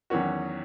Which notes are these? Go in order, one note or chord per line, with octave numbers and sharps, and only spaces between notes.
E2 D#3 F#3 C#4 F#4